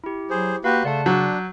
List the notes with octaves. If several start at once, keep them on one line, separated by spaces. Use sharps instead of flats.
E4 G4
F#3 G#4 C5
A#3 F#4 G4 B4 F5 C6 F#6
C#3 A3 D5 F#5 A5
F#3 D4 G6